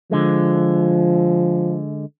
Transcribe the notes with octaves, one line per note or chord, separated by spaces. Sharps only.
D3 F3 G#3